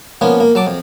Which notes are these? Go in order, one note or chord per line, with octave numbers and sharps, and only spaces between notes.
F3 A#3 B3 C#4
A#3
F#3 A5 D6
F2